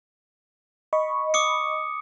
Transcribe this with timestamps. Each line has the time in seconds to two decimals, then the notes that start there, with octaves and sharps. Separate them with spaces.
0.93 D#5 B5 C#6
1.34 D6 D#6 C#7